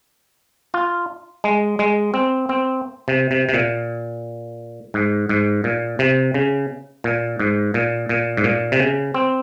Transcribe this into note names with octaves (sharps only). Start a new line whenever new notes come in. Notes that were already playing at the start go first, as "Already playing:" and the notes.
F4
G#3
G#3
C4
C4
C3
C3
C3
A#2
G#2
G#2
A#2
C3
C#3
A#2
G#2
A#2
A#2
G#2
A#2
C3
C#3
C4